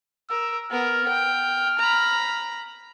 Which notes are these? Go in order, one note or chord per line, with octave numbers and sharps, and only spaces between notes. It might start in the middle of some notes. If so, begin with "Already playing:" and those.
A#4 E6
B3 A#4 F6
G5
A#5 B5